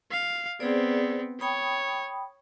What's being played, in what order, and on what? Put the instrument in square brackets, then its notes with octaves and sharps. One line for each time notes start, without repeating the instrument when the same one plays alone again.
[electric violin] F5
[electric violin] B3 C4 [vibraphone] G#4 C5 D5
[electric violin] C#5 [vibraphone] G5 B5 D#6